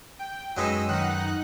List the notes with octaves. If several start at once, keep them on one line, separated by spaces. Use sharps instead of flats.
G5
F#2 F#3 G#3 D#4 B4 D#5 E6
D#3 D#4 F#5 F#6